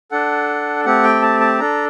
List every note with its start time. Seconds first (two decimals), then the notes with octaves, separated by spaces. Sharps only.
0.11 D4 A4 F#5
0.85 A3 C4 G4 F#5
1.03 G5
1.22 A5
1.40 A5
1.60 D4 A4 A#5